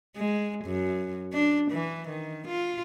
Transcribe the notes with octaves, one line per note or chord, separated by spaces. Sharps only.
G#3
F#2
D4
E3
D#3
F4